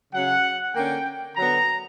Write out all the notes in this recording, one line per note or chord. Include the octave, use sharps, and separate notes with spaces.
C#3 F#3 C#4 F#5
D3 A#3 C#4 G5
D3 F#3 B3 A#5